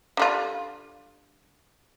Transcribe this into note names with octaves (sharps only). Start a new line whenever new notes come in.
D3 G3 F4